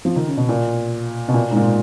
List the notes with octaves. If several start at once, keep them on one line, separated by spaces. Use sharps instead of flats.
F3
D#3
C#3
B2
A#2
B2
A#2
G#2
A#2